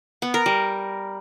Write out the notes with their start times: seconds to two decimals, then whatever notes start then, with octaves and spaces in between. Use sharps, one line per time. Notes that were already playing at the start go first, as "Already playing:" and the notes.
0.22 B3
0.34 A#4
0.46 G3